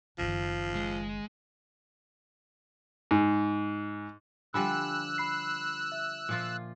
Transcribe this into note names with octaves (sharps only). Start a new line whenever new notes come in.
F#1 D#3 F3
G#3
G#2
D3 F3 G3 G5 G#5 B5 E6 F#6
B5 C7
E5
A#2 F3 F4